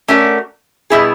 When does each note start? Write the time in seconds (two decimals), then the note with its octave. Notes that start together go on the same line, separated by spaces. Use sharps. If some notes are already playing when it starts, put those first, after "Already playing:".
0.08 A3 C#4 F#4 A#4 D5
0.90 B2 G3 B3 E4 G#4